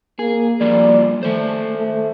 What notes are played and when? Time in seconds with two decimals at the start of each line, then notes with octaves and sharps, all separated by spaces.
0.19 A#3 G#4
0.61 F3 G3 A#3 D5
1.23 D#3 A3 C5
1.75 A3